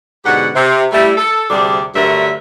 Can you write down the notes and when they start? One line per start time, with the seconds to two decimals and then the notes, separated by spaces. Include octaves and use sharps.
0.25 G#2 B2 D3 G4 F#5
0.55 C3
0.92 G3 A3 E4
1.17 A4
1.49 D2 C3 G3 D4 G#4 D5
1.95 G2 D3 F#3 A3 A#4 E5